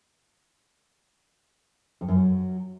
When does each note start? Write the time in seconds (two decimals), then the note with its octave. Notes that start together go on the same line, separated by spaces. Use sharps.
2.01 F2
2.08 F#2
2.16 F#3